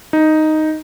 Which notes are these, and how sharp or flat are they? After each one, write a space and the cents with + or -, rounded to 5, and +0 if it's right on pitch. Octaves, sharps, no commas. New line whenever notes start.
D#4 +0